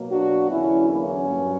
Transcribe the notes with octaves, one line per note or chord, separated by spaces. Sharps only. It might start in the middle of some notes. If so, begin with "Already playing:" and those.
Already playing: B2 F#3 A#3
D4 F#4
E2 D3 F#3 A#3 C#4 E4
A#3 C#4
G2 F#3